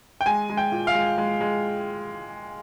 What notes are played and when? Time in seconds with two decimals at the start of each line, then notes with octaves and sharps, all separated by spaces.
0.21 G5
0.26 G#3 G#5
0.50 G#3
0.57 G5
0.72 A#2
0.87 F5
0.95 G#3
1.18 G#3
1.41 G#3